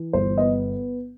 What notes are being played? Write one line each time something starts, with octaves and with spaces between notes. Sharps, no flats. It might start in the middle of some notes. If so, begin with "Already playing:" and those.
Already playing: E3
G1 C5
B3 D#5